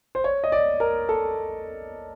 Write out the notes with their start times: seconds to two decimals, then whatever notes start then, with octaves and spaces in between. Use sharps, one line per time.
0.15 C5
0.24 C#5
0.44 D#5
0.52 D5
0.80 A#4
1.09 A4